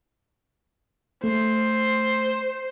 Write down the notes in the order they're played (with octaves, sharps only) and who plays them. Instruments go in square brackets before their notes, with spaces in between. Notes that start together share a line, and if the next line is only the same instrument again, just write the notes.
[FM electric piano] A3 [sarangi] C5